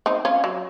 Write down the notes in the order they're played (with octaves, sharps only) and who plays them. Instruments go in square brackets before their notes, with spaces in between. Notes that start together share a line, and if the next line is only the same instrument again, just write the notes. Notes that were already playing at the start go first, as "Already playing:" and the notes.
[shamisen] C4 D#4
C#4 F4
F#3